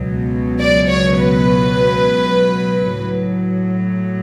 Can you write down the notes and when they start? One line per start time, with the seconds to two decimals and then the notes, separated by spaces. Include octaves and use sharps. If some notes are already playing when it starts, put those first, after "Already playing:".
Already playing: C#2 B2 F#3
0.59 D5
0.88 C#5
1.17 B4
2.94 A2 F#3